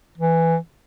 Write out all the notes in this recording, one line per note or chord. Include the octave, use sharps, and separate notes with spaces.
E3